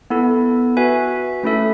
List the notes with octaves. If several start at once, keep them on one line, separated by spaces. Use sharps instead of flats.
B3 E4 A4
F#4 B4 E5 G#5
A3 C#4 E4 A4 E5